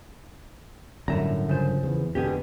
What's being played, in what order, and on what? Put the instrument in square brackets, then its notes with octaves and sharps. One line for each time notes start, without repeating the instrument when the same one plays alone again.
[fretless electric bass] G1 F#2 D3 [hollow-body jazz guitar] A2 E5 A#5
[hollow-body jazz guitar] C#3 F3 C5
[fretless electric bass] E2
[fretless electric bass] F1 B2 D3 [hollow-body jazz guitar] G4 G#4